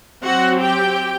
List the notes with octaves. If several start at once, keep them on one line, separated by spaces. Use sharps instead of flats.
F#3 C4 F#4 F#5
G4 G5